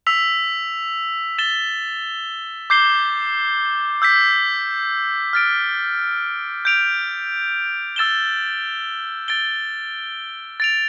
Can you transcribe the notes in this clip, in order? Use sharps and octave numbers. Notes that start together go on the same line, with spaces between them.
E6 B6 F7
A6 E7 G7
D6 G6 C7 G7
E6 G6 B6
F6 A6 D7
G6 D7 F7
E6 A6 E7 G7
A6 D7 G7
A6 D7 F7